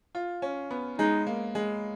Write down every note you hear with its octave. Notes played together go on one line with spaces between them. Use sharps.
F4
C#4
B3
G#3 D#4
A#3
G#3